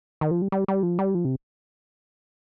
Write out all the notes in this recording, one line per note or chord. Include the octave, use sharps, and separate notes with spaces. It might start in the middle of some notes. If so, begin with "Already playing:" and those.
D#3
F3
G3
G3
G3
F3
G3
F3
C3